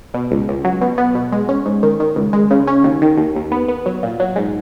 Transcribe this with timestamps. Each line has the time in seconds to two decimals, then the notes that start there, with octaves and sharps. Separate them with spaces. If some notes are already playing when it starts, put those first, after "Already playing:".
0.14 B2
0.31 C#2
0.48 C#2
0.64 F#3
0.81 B2
0.98 B3
1.15 B2
1.32 G#3
1.49 C#4
1.66 G#2
1.83 D#3
2.00 D#3
2.16 C#2
2.33 G#3
2.51 C#3
2.67 C#4
2.84 D#2
3.02 D#3
3.17 D#2
3.36 D#2
3.52 B3
3.68 B3
3.86 F#3
4.03 A#2
4.20 F#3
4.36 G#2